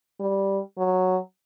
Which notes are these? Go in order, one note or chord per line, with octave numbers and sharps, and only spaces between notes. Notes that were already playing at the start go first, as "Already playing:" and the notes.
G3
F#3